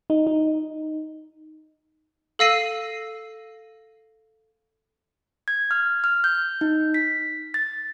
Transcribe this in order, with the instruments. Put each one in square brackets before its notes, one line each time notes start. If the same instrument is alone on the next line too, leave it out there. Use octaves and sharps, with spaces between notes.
[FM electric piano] D#4
D#4
[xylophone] A4 F5 E6 A#6 C7 D#7
[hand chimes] G#6
F6
F6
G6
D#4
B6
A6